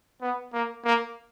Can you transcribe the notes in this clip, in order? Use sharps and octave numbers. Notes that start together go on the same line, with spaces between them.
B3
A#3
A#3